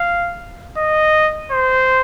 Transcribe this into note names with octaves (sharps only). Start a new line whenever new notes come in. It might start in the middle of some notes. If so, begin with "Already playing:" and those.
Already playing: F5
D#5
C5